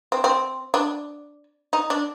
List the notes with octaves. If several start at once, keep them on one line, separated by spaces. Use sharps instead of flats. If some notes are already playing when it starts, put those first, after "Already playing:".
C4
C4
D4
D#4
D4